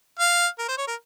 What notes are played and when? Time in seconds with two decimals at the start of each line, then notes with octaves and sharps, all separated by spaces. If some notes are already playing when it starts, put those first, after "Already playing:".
0.19 F5
0.58 A#4
0.68 C5
0.78 C#5
0.88 A#4